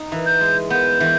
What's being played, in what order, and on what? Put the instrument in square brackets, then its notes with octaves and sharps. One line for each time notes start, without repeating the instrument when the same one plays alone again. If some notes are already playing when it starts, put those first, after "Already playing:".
Already playing: [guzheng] D#4
E3
[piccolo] G6
[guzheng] G#3
[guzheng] B3 [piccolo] G6
[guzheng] E3